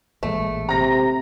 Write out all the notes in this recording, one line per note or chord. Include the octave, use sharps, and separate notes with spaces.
A1 A#2 G#3 A3
C3 A#5 A#6